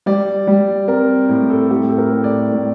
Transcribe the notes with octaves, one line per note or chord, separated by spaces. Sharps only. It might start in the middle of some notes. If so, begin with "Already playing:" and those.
G3 D5
G3
C4 A#4
A2
A4
A2 G4
A4
A#4
A2
D5
A2